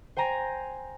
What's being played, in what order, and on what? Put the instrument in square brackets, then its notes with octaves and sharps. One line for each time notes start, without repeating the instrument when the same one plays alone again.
[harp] C5 G5 G#5 A#5 A#6